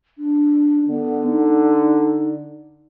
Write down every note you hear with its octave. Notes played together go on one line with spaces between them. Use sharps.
D4
D3 B3
D#4